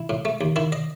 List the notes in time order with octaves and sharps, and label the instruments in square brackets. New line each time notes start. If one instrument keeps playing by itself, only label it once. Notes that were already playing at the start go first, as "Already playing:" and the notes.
Already playing: [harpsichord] E4
A2
A3
D#2
D#3 E4
D#5